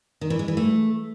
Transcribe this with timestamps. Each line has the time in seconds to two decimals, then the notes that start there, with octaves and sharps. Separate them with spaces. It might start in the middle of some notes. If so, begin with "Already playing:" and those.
0.21 D#3
0.30 E3
0.39 G#3
0.48 E3
0.57 A3